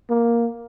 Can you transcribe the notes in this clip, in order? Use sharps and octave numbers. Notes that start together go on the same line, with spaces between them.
A#3